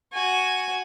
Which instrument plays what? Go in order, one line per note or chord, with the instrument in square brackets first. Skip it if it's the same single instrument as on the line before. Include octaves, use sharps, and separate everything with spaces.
[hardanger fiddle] F#4 G#5